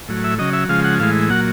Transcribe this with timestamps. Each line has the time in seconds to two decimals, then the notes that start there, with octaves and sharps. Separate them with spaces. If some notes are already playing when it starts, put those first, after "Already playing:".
0.09 A2 F#3
0.24 E5
0.38 C#3 F#3 D#5
0.53 E5
0.69 C#3 F3 G#3 F5
0.84 F#5
0.99 A2 E3 G#3 F5
1.30 A#2 F#3 F#5